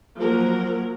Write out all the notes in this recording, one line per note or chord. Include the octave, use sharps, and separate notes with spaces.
F3 F#3 A#3 A#4